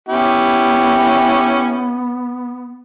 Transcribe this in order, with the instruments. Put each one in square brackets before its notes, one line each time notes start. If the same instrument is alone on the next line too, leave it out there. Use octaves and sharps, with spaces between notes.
[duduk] B3 [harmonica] C#4 E4 G4